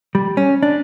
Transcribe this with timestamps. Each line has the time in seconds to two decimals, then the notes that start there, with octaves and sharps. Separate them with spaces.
0.15 G3
0.37 C#4
0.63 D4